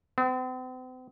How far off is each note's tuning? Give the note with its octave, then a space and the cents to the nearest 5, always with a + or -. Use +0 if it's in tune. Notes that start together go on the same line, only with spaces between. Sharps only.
C4 -45